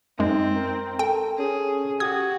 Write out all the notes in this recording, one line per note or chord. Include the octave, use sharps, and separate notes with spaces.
F#2 G#3 C4 D#4
A#4
A4 G5
C#4 G#4
F#4 G4 D#6 G#6